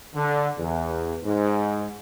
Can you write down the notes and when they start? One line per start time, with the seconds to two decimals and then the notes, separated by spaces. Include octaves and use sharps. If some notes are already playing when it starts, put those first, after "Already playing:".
0.15 D3
0.58 E2
1.24 G#2